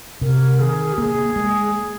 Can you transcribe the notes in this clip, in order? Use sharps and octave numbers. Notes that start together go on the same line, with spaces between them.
C3 A#4
D#3 G#4
G4
A#3 G#4
G#3